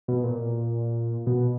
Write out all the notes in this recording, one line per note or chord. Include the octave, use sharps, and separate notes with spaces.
B2
A#2
B2